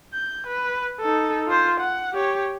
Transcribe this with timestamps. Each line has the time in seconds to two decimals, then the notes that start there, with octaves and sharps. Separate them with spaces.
0.14 G6
0.47 B4
1.00 D#4 A4
1.47 F4 C5
1.80 F#5
2.13 G4 C#5